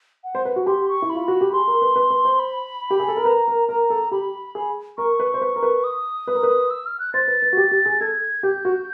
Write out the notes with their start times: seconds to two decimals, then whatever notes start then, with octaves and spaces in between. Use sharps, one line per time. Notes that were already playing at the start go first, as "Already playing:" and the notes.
0.24 F#5
0.35 C5
0.45 B4
0.56 F#4
0.67 G4 C6
0.88 C#6
1.02 E4
1.10 B5
1.15 F4
1.28 F#4
1.41 G4
1.53 G#4 C6
1.67 A#4
1.82 B4
1.96 B4
2.10 B4
2.25 C5
2.39 B5
2.90 G4
3.00 G#4
3.08 A4
3.17 A#4
3.25 B4 A#5
3.48 A#4
3.69 A#4 A#5
3.90 A4
4.11 G4 B5
4.55 G#4
4.98 A#4 C#6
5.20 B4
5.34 C5
5.41 B4
5.56 A#4
5.63 B4
5.84 D#6
6.27 B4
6.35 A#4
6.43 B4
6.70 E6
6.86 F6
6.99 F#6
7.13 C5 A6
7.28 B4
7.42 B4
7.53 F#4
7.57 G4
7.71 G4
7.86 G#4
8.01 A4 G#6
8.43 G4 G6
8.65 F#4